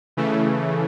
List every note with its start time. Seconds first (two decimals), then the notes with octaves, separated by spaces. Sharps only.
0.17 C#3 E3 A3